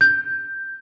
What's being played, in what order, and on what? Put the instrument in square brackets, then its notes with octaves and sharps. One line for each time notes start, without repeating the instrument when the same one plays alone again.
[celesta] G6